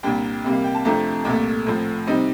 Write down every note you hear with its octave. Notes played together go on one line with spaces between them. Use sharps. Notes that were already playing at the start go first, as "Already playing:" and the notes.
C2 A#2 G3 D4 G5
C3 G3 A#3
F5
G5
A5
F2 C3 F3 A3 D4 A#5
C2 A#2 A3 D6
A2 F3 C4
C3 G3 C4 D#4